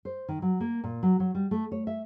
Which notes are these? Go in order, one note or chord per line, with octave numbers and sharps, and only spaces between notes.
C5
D#3
F#3
A#3
A#2
F#3
F#3
G3
A3
C#5
E5